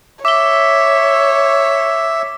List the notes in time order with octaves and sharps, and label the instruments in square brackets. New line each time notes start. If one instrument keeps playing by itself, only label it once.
[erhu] C#5 [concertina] E5 [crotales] D6 G7